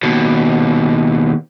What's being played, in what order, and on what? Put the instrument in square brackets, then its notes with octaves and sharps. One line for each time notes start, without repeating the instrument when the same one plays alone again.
[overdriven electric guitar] D#2 B2